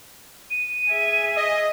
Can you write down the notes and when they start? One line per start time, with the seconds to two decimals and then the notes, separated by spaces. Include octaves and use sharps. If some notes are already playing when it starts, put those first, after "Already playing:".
0.50 D#7
0.90 G#4 E5
1.36 D#5